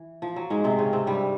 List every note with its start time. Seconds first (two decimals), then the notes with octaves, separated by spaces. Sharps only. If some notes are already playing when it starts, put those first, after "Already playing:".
Already playing: E3
0.22 F3
0.36 F#3
0.50 G#2 G#3
0.64 C3 C4
0.79 C#3 C#4
0.93 C3 C4
1.07 G2 G3